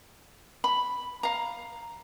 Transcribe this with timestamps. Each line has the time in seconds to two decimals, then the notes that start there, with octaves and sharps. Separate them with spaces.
0.64 B5
1.23 F5 A#5